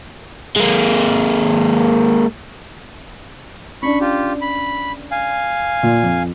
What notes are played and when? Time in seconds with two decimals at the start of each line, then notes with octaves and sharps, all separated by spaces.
0.56 G#3 A#3
3.83 C#4 D4 B5 C#6
4.01 F4 G4
4.42 B5
5.11 F5 G#5
5.83 A#2
6.03 F2